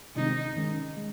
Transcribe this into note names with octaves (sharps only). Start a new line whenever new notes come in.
C3 D#3 G#3 C4 D#4
D#3 G#3 C#4
G#3